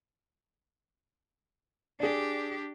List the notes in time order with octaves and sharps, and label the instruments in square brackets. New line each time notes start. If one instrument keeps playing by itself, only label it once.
[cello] D4 G4 [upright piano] G#4 D5